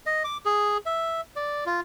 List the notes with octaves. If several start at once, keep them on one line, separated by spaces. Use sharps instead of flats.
D#5
D6
G#4
E5
D5
F4